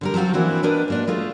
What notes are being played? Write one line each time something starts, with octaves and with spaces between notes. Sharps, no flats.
D3 G3 A#4
F3 F#3 C4 F4 F#4
E3 A#3 C4 D4 E4 F#4
B3 D4 A#4 B4 D#5
G#2 A#3 D4
G#3 A3 F4